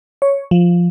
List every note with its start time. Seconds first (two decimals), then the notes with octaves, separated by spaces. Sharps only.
0.22 C#5
0.51 F3